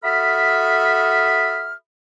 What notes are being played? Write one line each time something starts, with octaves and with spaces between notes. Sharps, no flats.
F#4 A4 E5 B5 D#6 F6